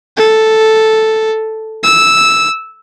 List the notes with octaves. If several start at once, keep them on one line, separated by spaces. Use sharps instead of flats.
A4
E6